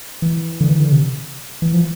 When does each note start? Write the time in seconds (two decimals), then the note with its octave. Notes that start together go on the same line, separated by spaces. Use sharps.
0.22 E3
0.61 D3
0.69 E3
0.80 D3
0.92 C3
1.62 E3
1.74 F3